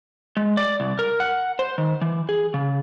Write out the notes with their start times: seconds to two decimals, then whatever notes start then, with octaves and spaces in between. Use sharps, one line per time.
0.37 G#3
0.57 D5
0.80 C2
0.99 A#4
1.20 F#5
1.59 C5
1.78 D#3
2.02 E3
2.29 G#4
2.54 C#3